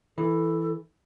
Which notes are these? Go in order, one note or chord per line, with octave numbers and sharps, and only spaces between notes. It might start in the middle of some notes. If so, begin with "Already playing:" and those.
E3 A4